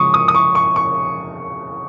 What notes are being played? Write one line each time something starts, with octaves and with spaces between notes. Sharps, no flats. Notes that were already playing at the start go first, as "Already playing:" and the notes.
Already playing: C#3 F3 G#3 C#6 D#6
D#6
D#6
C#6
C#6
C#6